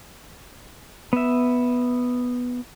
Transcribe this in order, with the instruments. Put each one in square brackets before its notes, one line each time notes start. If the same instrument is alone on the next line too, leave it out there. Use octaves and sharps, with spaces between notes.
[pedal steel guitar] B3 E5